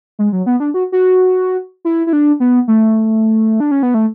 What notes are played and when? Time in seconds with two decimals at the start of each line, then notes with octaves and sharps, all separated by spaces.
0.19 G#3
0.33 F#3
0.46 B3
0.60 D4
0.74 F#4
0.92 F#4
1.85 E4
2.07 E4
2.13 D4
2.40 B3
2.68 A3
3.60 D4
3.71 C#4
3.83 B3
3.94 A3